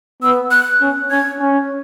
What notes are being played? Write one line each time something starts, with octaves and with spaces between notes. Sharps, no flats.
B3 E6
F#6
C#4
C#4 G#6
C#4